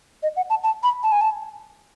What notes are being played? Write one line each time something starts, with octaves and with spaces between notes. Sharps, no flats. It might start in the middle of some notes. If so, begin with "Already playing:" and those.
D#5
F#5
A5
A5
B5
A5
G#5
A5